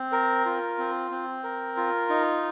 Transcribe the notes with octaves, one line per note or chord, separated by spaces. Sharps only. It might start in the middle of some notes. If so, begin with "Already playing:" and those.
Already playing: C4
A#4
F4
C4
C4
A#4
F4
D#4